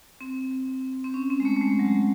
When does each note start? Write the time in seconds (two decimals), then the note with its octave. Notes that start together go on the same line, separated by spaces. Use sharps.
0.21 C4
1.04 C4
1.14 C#4
1.30 C4
1.40 G#3
1.45 A3
1.56 A3
1.61 G#3
1.79 F#3
1.85 G#3